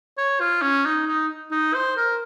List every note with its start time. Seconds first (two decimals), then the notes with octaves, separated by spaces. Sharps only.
0.17 C#5
0.40 F4
0.62 C#4
0.85 D#4
1.07 D#4
1.51 D#4
1.74 C5
1.96 A#4